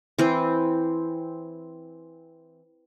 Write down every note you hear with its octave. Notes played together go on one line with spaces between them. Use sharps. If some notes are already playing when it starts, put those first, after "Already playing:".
E3 C4